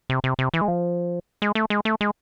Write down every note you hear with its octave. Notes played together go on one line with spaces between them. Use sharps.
C3
C3
C3
E3
G#3
F3
G#3
A3
G#3
A3
G#3